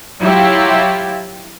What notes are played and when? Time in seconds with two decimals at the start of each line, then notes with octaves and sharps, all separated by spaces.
0.21 F#3 E4 F4 G4